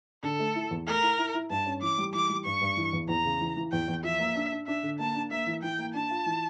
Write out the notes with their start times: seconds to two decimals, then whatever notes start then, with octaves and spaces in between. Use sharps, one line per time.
0.23 D3 A4
0.39 A3
0.55 E4
0.71 E2
0.87 A3 A#4
1.02 E4
1.18 E4
1.34 E4
1.50 G2 A5
1.66 C#4
1.82 E3 D6
1.98 G3
2.14 E3 D6
2.30 G3
2.45 G2 C#6
2.61 G2
2.77 E3
2.93 E2
3.09 E2 A#5
3.25 C#3
3.41 E3
3.56 E3
3.72 E2 G5
3.88 E2
4.03 F3 E5
4.20 A#3
4.35 D4
4.52 D4
4.67 D4 E5
4.83 D3
4.99 A#3 A5
5.15 D4
5.31 A#3 E5
5.47 E3
5.63 E3 G5
5.78 A#3
5.94 D4 A5
6.10 F4
6.26 E3